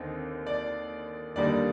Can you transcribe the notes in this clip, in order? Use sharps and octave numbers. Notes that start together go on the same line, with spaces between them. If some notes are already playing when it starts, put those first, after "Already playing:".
Already playing: D#2 D3 C4 D#4
D5
D#2 D3 G3 A#3 D#4 D5